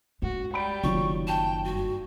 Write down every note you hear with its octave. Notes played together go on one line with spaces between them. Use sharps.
G#3 C#4 F#4
G3 G5 B5 D7
F#1 D#3 F#3 F4 C#6
G5 A5
G2 F#4